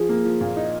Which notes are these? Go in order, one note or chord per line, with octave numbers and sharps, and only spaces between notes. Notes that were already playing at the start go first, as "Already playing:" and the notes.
Already playing: F3 G#4
A#3
F3
A#2
D#4